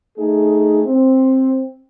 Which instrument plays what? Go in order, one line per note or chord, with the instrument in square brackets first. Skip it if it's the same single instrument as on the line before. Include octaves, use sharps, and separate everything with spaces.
[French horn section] A3 D#4 G#4
C4